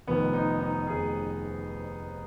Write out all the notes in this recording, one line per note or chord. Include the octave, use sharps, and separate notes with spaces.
F1 F2 D#3 B3
D#4
D#4
F1 F2 D#3 G#4